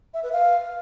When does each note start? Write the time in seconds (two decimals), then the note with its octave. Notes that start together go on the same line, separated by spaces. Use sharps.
0.14 E5
0.23 B4
0.32 F5